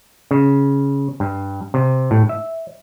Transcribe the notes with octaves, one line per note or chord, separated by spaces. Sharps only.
C#3
G2
C3
A2
E5